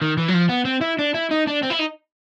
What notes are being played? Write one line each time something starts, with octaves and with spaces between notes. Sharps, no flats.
D#3
E3
F#3
F3
B3
C4
E4
D4
E4
D#4
D4
C4
E4
D#4